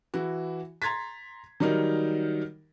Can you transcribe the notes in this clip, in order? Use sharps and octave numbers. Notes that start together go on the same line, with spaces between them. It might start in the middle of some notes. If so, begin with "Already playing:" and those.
E3 E4 F#4
A#5 C6 G#6 A6 B6
D#3 F#3 G3 D#4 A#4